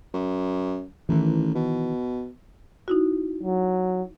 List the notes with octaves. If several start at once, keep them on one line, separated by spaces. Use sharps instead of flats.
F#2
A1 D#3 E3
B2
D#4 E4 F#4
F#3